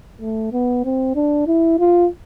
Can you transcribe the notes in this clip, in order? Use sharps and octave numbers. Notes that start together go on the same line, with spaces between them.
A3
B3
C4
D4
E4
F4